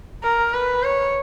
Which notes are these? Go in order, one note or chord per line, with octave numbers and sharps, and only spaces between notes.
A#4
B4
C#5